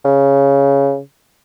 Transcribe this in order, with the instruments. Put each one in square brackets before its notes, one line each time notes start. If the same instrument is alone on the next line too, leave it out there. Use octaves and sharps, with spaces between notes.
[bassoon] C#3